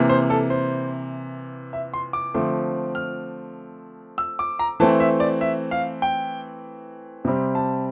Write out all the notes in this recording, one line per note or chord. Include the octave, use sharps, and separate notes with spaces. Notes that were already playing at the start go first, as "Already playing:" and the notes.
Already playing: C3 E3 A#3
C5
A4
C5
E5
C6
D6
D3 F3 A3 C4
F6
E6
D6
A#5
E3 A3 C4 A5
E5
D5
E5
F5
G5
C3 G3 C4
A5